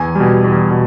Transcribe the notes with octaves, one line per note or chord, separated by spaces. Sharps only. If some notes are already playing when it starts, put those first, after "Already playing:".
Already playing: E2 G#5
B2 G3
E2
B2